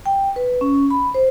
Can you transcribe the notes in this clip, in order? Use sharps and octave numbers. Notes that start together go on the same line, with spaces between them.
G5
B4
C#4
B5
C5